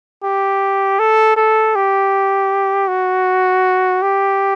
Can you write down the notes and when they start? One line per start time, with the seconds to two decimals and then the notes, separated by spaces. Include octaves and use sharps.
0.23 G4
0.99 A4
1.37 A4
1.75 G4
2.88 F#4
4.02 G4